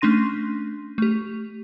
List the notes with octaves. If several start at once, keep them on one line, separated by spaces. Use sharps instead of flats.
A3 C#4 D4 C6 A#6 D#7
A3 G4